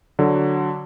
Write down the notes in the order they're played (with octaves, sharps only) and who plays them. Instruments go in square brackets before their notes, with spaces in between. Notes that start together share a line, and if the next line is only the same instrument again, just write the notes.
[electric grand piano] D3 F#3